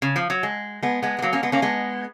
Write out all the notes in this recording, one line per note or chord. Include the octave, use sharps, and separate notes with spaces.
C#3
F3
F#3
G#3
G#3 B3
G#3 B3
G#3
F#3 A#3
A#3 C#4
G#3 B3
A#3 C#4
G#3 B3